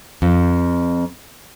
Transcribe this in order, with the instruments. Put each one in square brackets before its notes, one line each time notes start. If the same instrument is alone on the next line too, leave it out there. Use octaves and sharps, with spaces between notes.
[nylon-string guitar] F2